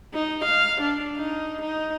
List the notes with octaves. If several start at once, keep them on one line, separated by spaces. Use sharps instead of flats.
D#4
F5
D4
D#4
D#4